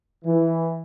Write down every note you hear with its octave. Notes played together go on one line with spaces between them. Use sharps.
E3